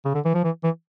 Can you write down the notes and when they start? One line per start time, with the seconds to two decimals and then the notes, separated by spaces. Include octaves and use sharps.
0.05 C#3
0.15 D3
0.25 E3
0.34 F3
0.44 E3
0.64 E3